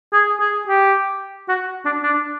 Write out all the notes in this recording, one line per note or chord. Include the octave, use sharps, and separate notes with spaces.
G#4
G#4
G4
F#4
D4
D4